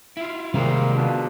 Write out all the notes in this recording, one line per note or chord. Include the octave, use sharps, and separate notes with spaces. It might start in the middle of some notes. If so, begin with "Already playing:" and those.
E4 F4
C3 D#3 G3 G#3 A#3 F4 G#4 C5
B2 F3 D4